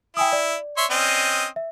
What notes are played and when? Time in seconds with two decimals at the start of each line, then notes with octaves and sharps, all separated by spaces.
0.17 E4 G5 G#5 D#6
0.33 D5
0.77 C#5 E5 C6
0.90 C4 C#4 D#5
1.56 E5